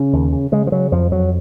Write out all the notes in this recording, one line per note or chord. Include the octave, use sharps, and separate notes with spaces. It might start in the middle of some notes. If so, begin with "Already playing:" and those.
Already playing: C#3 C#4
D#2
C#3
C#3 G#3
F3
C#3 F#3
F2 F3
F2 F#3